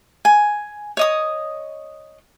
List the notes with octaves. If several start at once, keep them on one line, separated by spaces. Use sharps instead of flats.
G#5
C#5 D#5 D#6